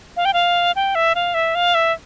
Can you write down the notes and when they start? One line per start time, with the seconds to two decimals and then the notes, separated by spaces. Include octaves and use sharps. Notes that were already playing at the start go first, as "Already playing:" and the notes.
0.17 F5
0.25 G5
0.33 F5
0.76 G5
0.95 E5
1.15 F5
1.34 E5
1.55 F5
1.75 E5